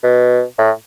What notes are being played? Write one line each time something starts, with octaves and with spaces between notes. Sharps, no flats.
B2
A2